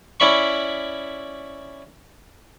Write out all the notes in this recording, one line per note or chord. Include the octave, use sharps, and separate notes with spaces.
C#4 E4 D5 B5 C#6